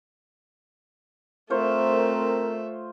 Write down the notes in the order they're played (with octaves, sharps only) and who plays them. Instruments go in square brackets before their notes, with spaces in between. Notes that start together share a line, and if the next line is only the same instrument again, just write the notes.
[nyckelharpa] A3 E5 [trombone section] C4 A#4 [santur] F4 C5 C#5